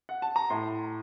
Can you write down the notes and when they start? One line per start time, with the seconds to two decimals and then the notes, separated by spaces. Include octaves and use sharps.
0.09 F#5
0.22 A5
0.36 A#5
0.50 A2 C6